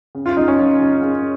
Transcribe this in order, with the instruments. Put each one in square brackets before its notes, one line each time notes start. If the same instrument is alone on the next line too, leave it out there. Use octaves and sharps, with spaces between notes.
[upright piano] C#3
F4
F#2 D#4
C#4
F#2
C#3
C#3